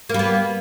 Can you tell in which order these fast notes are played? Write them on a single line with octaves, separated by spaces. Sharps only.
A#3 G3 B3